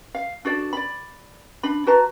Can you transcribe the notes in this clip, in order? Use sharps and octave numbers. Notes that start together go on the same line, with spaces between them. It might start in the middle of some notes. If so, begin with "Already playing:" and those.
F5
D4 F#4 A4 D5
D5 B5
D4 B5
F#4 B4 A5 A#5